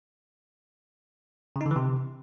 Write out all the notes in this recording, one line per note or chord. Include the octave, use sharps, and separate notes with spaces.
C#3
D#4
D3
E3
C3